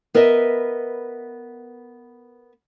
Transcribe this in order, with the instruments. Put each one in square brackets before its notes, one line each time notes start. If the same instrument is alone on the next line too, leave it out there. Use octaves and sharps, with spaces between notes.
[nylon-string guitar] B3 A#4 B4 D#5 E5